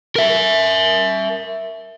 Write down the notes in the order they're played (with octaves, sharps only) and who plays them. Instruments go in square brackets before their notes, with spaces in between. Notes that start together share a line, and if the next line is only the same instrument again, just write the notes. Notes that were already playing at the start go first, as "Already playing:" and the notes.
[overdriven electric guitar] A#4 E5